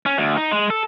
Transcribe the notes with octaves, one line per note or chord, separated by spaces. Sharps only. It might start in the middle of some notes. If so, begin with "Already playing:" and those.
C#4
D2
D#4
G#3
A4